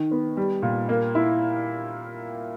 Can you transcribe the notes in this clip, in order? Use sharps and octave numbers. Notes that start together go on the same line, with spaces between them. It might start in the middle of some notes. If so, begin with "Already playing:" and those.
Already playing: D#3
B3
G3
A#2
A#3
E4